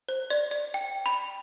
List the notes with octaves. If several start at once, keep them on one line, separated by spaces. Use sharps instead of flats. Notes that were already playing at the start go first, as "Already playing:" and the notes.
C5
D5
D5
G5
B5